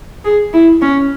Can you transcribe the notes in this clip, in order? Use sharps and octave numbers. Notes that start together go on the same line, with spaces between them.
G#4
E4
C#4